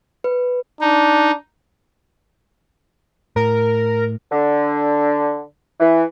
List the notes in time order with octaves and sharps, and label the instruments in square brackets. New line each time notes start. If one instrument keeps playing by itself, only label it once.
[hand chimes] B4
[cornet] D4 [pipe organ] D#4
[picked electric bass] A2 [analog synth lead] A#4
[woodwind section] D3
E3